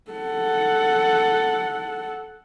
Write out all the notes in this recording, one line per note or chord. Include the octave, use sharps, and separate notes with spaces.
A4 F#5